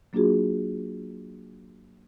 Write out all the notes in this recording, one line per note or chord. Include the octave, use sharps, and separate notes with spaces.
F#3 A#3 D4 F4 F#4 G#4